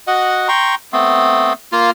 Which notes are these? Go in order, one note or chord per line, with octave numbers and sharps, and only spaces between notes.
F#4 D#5 F#5
G5 A#5 C6 C#6
A3 B3 C4
A#3 F4